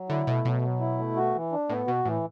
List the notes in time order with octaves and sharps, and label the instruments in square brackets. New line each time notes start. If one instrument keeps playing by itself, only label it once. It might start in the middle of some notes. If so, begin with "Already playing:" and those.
Already playing: [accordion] F#3
[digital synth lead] D3 [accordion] E4
[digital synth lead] B2 [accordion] A3
[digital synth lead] B2 [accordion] F#3
[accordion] F#3
E4
A3
F#4
E3
D4
[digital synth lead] A2 [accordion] B3
[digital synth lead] B2 [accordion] F#4
[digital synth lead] A2 [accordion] E3